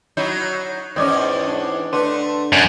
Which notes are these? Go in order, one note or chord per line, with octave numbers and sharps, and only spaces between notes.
F#3 D#4 E4 G6
E2 G#2 C#4 D5 D#5 G5
D4
D3 A3 B4 C6
F#2 D4